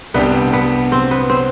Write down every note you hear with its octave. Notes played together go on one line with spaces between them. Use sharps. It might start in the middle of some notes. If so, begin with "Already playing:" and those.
C2 C3 G3 B3 D4 G4
B3
C4
B3
C4